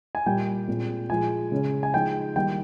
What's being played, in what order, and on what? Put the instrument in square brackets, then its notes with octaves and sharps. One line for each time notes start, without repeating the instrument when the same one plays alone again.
[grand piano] G#5
A#2 G3 A#3 G5
A#2 G#3 C4
A#2 F3 G#3 G#5
C#3 G#3 C#4
G#5
F3 G#3 D#4 G5
D#3 G3 A#3 D#4 G5